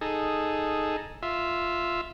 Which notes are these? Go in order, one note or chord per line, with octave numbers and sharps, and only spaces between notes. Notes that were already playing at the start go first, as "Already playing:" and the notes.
D#4 G#4 A4
F4 E5